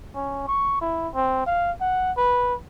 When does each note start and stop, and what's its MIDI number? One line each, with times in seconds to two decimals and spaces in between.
0.15 0.43 61
0.48 0.78 85
0.81 1.08 64
1.15 1.42 60
1.47 1.72 77
1.81 2.12 78
2.17 2.54 71